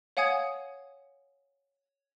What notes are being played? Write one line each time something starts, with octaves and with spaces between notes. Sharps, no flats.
C#5 F5 F#5 G#5 D#6 G#6